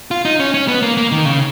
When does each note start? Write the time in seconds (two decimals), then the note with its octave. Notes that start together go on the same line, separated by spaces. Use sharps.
0.11 F4
0.25 D#4
0.40 C#4
0.54 C#4
0.68 B3
0.82 A#3
0.97 A#3
1.12 D#3
1.25 C#3